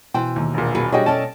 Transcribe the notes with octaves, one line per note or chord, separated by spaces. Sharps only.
B2 E3 C5 G5
D#2
E1 A#2
F#4 G#4 B4
G3 D4 F#4 G#4 C#5 D#5 G5
A3 C#4 D5 A5